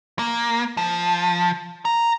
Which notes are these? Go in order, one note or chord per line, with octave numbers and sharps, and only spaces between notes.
A#3
F3
A#5